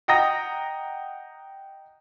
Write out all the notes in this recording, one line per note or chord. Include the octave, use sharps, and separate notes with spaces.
D#5 F#5 G5 A#5 D#6 A#6